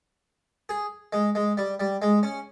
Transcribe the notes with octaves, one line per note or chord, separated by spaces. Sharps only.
G#4
G#3
G#3
G3
G3
G#3
C#4